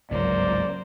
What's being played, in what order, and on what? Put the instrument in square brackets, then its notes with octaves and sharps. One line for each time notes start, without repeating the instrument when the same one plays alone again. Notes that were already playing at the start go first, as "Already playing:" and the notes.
[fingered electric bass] G1 C#2 G#2 [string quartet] F#3 A#3 C5 [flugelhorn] D5